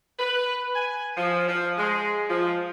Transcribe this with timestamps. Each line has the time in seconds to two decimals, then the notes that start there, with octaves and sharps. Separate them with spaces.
0.19 B4
0.75 G#5
1.17 F3
1.49 F3
1.78 G#3
2.30 F3